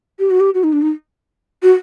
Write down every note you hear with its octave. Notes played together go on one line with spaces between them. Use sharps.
G4
F#4
G4
F#4
D#4
D4
D#4
F#4